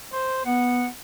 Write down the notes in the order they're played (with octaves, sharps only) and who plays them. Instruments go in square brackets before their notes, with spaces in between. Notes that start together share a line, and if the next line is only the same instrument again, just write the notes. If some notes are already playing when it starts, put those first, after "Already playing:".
[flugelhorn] C5
[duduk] B3 [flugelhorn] F#5